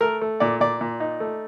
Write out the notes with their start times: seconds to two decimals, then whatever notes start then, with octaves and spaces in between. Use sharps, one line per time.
0.01 A3 A#4
0.21 A3
0.40 A#2 D5
0.60 A#2 D5
0.81 A#2
1.00 D#4
1.20 A3